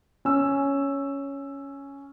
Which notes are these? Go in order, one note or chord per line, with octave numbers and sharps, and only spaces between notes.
C#4 E6